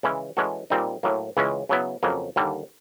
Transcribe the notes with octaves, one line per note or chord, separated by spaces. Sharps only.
C#3 E3 G#3 C#4 E4
E3 G#3 C#4 F#4 A4
A#2 G3 C4 D#4
A2 F#3 A#3
C#2 C#3 E3 G#3 C#4
C#3 F#3 B3 E4
F2 C#3 F#3 A#3
D#2 D3 G3 A#3